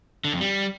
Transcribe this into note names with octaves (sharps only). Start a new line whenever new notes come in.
D3
F2
G3